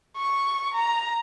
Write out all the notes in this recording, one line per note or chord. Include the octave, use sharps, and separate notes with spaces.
C#6
A#5